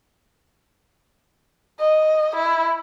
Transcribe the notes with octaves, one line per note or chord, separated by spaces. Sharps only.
D#5
E4